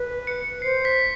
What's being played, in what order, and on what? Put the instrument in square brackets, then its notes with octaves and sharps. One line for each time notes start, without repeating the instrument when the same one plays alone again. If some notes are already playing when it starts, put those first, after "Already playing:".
Already playing: [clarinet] B4
[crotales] C#7
[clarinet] C5 [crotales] C7
[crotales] B6